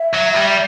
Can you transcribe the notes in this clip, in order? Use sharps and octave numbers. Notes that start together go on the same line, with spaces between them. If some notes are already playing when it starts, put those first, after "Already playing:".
Already playing: E5
F#3
G3